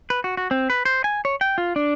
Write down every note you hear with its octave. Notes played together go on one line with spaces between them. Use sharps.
B4
F#4
F#4
C4
B4
C5
G#5
C#5
G5
F4
D4